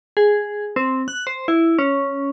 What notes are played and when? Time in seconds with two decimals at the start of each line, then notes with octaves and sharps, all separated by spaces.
0.17 G#4
0.76 C4
1.08 F#6
1.27 C5
1.48 E4
1.79 C#4